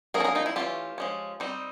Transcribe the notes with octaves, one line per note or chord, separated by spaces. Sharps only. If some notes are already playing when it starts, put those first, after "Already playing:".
F3 A#3 C#4 G#4 A#4
A4
G#4 A#4
D#4 F4
E4
E3 A3 C#4 F4 G4
F3 G#3 C#4
G3 C4 D#4